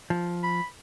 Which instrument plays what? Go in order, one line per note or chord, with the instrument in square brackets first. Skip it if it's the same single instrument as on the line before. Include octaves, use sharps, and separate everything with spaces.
[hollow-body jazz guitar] F3
[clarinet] B5